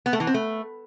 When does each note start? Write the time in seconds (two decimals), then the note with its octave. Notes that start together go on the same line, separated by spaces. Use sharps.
0.06 B3
0.13 A3
0.20 E3
0.27 C4
0.34 A3